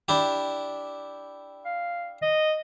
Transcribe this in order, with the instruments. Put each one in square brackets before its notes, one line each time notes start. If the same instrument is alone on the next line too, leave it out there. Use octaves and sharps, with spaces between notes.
[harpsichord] D4 E4 G4
[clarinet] F5
D#5